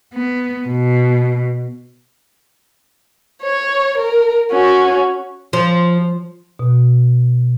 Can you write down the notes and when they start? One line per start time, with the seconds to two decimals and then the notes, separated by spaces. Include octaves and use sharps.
0.13 B3
0.68 B2
3.42 C#5
3.98 A#4
4.52 C#4 F#4
5.53 F3
6.59 B2